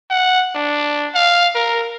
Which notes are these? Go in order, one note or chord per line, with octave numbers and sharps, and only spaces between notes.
F#5
D4
F5
A#4